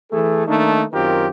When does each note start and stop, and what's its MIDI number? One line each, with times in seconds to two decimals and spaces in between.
0.11 0.46 52
0.11 0.46 57
0.11 0.46 68
0.11 0.46 69
0.47 0.83 51
0.47 0.83 57
0.47 0.83 58
0.47 0.83 62
0.47 0.83 63
0.93 1.27 42
0.93 1.27 51
0.93 1.27 60
0.93 1.27 65
0.93 1.27 67
0.93 1.27 70